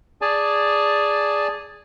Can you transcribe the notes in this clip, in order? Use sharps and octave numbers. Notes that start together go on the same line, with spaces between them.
G#4 D5 G#5 A5